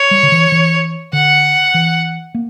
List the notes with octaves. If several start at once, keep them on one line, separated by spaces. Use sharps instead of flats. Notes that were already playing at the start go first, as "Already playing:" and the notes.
Already playing: C#5
G3
D3
E3
E3
D3 F#5
E3
A#3